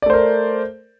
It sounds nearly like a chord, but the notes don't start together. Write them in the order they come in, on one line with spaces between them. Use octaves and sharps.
D5 A3 C5 A#4